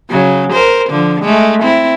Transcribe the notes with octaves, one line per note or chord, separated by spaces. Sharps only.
C#3 F#3
A#4 C5
D3 F3
G#3 A3
C4 E4